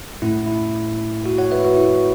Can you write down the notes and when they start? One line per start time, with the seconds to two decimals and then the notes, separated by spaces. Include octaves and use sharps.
0.22 A2 A3 C#4 E4
0.46 E4
1.26 F#4
1.38 C#5 F#5
1.51 B4 E5
1.65 F#4
1.77 E4